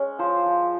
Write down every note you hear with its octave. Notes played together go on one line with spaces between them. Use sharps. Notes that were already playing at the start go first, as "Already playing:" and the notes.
Already playing: G#3 C#4
F3 C5
F3